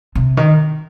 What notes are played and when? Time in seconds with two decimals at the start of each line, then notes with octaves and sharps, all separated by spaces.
0.15 C3
0.37 D#3